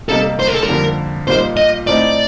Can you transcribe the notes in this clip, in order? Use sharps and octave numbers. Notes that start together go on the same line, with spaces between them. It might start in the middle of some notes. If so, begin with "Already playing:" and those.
C3 G3 A#3 D#4 A4
C5
A#4
A4
A#4
F2 D3 G3 A#3
A#2 G3 A#3 D#4 C5
D#5
A2 A3 C4 D#4 D5